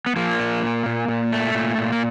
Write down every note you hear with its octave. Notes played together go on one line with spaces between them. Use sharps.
B3
F3 A#3
A#2
A#2
A#2
A#2
A3
A#2
A#2
A#3